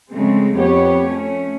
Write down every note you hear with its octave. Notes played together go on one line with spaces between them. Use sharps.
C#3 F3 G#3 A3 C4
F2 B3 G4 C#5
A3 C#4